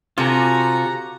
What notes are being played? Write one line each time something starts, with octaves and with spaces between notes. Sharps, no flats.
C3 F4 F#4 A4 G#5 A#5